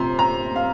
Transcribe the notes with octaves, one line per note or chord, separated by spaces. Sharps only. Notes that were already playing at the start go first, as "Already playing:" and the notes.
Already playing: C3 F3 A#5 C6
A#5
F5